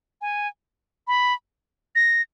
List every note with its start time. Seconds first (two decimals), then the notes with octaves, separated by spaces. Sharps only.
0.21 G#5
1.07 B5
1.96 A#6